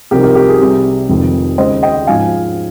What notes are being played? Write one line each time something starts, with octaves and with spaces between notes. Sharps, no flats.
C2 C3 F3 C4 D#4 G4 A#4
G4 A#4
G4
G#4
C2 C3 G3
F1 F2 C3 D#3 G#3
D#2 C#3 G#3 C5 D#5
D#5 G5
G#2 F3 G#3 C#4 F5 G#5